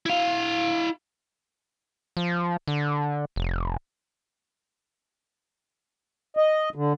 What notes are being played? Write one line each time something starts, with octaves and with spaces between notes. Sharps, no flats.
E4 F5
F3
D3
F1
D#5
D3